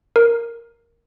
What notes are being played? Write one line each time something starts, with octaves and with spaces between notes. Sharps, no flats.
A#4